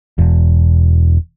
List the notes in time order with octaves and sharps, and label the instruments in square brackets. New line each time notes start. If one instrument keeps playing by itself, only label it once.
[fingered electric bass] E1